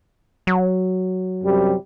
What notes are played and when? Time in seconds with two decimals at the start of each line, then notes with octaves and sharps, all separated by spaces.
0.47 F#3
1.44 F#2 C3 G3